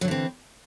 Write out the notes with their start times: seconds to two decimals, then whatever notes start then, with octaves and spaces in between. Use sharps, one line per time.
0.01 F#3
0.05 D3
0.08 E3
0.11 C4